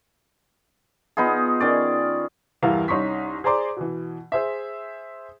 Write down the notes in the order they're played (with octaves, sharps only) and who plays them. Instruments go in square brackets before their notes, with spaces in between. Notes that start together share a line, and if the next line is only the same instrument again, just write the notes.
[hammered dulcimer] B3 D#4 F4 G#4
D#3 C#4 D5
[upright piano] E2 G2 E3 E4 A#4 F5
C2 C#4 D#4 C6 C#6 B6
G#4 C5 D5 A#5 C6 D6
B2 E3
G#4 C5 E5